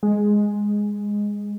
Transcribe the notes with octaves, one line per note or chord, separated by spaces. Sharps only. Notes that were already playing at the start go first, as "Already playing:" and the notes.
G#3